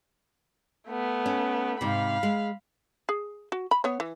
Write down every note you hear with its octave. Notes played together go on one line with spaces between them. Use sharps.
A3 B3
C#4
G#2 C3 F5 B5
G#3
G#4
F#4
B5
B3 C#5
E3